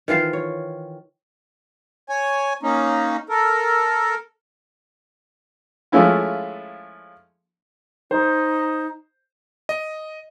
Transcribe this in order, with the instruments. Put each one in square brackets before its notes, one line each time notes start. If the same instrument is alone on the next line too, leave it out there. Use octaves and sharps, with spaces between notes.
[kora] D#3 E3 F4 C5
C#5
[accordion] C#5 G#5
A#3 C#4 D#4
A4 A#4
[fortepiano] F3 G#3 A3 C#4 E4 F4
[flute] D#4 [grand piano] C5
[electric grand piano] D#5